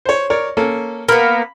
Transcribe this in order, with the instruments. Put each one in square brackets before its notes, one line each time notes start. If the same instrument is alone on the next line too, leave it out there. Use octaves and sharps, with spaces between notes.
[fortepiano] C5 C#5
A#4 C#5 D5
A#3 C#4 A4
[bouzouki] A#3 B3 [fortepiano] B5